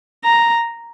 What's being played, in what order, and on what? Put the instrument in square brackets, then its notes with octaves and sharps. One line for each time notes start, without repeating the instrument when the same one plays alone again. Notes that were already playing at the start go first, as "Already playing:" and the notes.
[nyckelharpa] A#5